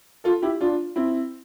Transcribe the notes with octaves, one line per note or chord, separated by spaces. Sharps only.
F4 A4
E4 G4
D4 F4
C4 E4